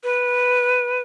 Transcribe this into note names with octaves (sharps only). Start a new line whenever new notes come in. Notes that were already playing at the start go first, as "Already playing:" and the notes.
B4